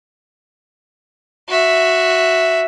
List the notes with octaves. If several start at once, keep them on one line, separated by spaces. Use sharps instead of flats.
F#4 E5